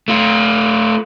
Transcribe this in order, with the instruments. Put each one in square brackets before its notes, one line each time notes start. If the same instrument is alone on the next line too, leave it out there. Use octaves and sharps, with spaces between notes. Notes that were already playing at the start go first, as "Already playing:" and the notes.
[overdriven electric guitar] A3 F4